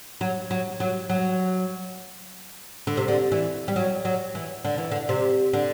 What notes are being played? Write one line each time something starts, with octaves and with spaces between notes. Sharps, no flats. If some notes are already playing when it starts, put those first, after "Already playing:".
F#3
F#3
F#3
F#3
D3
C3
D3
E3
G3
F#3
F#3
E3
D3
E3
D3
C3
D3